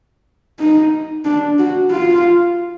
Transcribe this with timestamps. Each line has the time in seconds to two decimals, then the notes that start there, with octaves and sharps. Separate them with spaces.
0.59 D#4
1.25 D4
1.59 F#4
1.91 F4